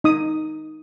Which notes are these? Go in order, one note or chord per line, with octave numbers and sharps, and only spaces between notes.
D#4 D#6